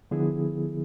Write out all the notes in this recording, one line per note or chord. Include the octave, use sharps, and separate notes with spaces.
D3 F3 B3 E4 G#4